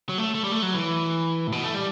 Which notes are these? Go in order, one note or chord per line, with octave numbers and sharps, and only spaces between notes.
F#3
A3
A3
G3
A3
F#3
E3
A2
B2
A3
G3